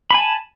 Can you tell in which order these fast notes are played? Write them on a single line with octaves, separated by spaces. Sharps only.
B5 G#5 A5